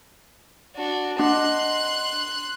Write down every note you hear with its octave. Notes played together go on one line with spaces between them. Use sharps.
D4 F#4
D4 D#5 F#5 C6 F#6